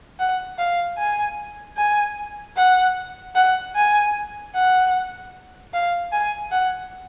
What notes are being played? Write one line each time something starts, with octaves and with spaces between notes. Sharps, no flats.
F#5
F5
G#5
G#5
F#5
F#5
G#5
F#5
F5
G#5
F#5